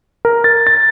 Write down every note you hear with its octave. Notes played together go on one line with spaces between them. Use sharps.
A#4
A6
A6